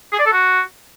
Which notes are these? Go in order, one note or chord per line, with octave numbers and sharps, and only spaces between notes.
G#4
D5
A4
F#4